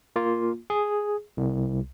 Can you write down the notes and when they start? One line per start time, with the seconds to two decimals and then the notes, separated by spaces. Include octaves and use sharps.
0.16 A#3 F4
0.70 G#4
1.37 C2